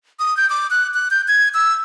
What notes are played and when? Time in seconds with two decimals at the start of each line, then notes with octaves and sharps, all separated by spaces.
0.19 D#6
0.37 G6
0.50 D6
0.70 F#6
0.94 F#6
1.11 G6
1.28 G#6
1.54 E6